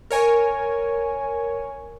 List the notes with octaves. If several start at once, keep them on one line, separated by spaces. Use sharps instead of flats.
A#4 C#5 G#5